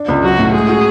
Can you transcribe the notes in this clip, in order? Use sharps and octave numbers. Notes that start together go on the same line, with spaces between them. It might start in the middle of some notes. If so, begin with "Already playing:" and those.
Already playing: D4
C#2
F#3 F#4
A2
G#3 G#4
F#4